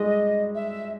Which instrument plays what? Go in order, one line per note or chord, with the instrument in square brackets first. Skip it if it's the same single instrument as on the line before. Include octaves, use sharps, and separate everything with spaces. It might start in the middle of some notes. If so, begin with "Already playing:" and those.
Already playing: [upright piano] G3 G#3 [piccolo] D#5
[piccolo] E5